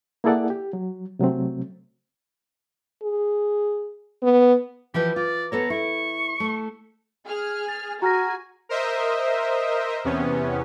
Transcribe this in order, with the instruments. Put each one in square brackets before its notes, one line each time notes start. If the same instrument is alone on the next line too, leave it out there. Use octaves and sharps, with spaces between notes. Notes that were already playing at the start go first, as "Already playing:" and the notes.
[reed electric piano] A#3 E4 G#4 A4 D5 F#5
G4
F#3
C3 F#3 A3 C4
[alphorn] G#4
B3
[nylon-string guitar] E3 F3 B4 [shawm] G4
[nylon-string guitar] F4 [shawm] D5
[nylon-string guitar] B3 A4 C#5 [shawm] A#5
[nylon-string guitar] E4 [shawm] C#6
[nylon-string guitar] A3
[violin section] G#4 F6
[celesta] A6
[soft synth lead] F#4 [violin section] G#4 G#5 [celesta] A#5 F6 A#6
[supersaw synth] A#4 C5 D#5 E5
E2 C3 B3 C#4